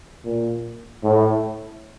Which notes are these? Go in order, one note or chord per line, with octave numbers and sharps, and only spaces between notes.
A#2
A2